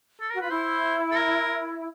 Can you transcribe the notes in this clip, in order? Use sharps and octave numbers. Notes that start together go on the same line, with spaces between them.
A4
F#4 A#4
F4 B4
E4 C5
A4
A#4